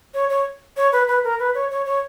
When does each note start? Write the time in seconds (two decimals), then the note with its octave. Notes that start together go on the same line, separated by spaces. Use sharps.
0.14 C#5
0.30 C#5
0.77 C#5
0.92 B4
1.08 B4
1.24 A#4
1.39 B4
1.55 C#5
1.71 C#5
1.86 C#5